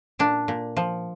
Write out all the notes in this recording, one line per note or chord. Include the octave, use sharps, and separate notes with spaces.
A#2 D4
A#2
F3